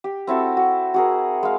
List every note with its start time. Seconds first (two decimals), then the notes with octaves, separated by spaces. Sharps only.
0.04 G4
0.27 C4 E4 F#4 A4
0.57 F#4
0.94 F#4 G#4 A#4
1.43 G#3 F5